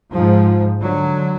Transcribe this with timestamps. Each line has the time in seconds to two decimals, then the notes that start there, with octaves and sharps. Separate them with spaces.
0.12 G#2 F3
0.80 D3 F#3